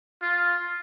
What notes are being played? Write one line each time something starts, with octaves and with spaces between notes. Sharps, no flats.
F4